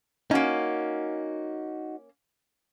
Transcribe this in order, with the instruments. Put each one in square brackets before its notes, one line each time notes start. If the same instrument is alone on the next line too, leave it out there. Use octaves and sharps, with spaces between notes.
[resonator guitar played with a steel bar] A#3 C#4 [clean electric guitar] D#4 F#4